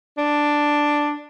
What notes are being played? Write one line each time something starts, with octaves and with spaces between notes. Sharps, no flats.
D4